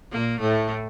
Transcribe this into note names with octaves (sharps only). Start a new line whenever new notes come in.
A#2 A#3
A2 A3